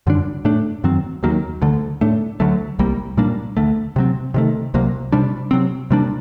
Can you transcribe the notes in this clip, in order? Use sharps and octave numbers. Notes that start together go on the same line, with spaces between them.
F#2 D3 G3 D4
A2 A3 D4
F#2 D#3 F#3 C4
D#2 D#3 F#3 A#3
D2 D3 A3
A2 A3 D4
D2 D3 F#3 A3
C2 C3 G3 A#3
A#2 G3 A#3 D4
D2 D3 A3
C3 F#3 C4
C3 D#3 A3
C2 C3 F#3 A#3
C3 G3 D4
C3 F#3 C4
C3 G3 A#3 D4